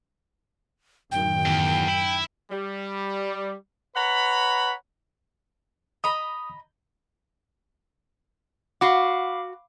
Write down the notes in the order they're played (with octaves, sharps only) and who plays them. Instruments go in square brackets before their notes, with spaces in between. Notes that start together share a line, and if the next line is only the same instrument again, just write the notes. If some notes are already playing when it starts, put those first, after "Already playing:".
[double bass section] F#2 A2 D#3 [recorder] G5
[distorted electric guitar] E2
E4
[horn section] G3
B4 C#5 F#5 A#5 B5
[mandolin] D#5 A#5 B5 [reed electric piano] D#6
[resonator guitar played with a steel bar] F#4 F#5 [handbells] F5 B5 D6